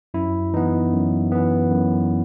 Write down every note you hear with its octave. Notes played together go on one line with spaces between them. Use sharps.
F#2 E4
E3 B3 D#4
F#2
E3 B3
F#2